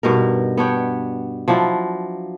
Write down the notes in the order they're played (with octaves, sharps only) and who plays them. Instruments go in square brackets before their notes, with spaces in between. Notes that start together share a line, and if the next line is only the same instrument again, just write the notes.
[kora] G2 B2 D#4 A#4
B3 D4 C#5 G5
F3 F#3 D4 E4